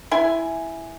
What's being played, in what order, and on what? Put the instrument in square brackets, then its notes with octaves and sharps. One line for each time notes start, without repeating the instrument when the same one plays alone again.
[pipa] E4 G#5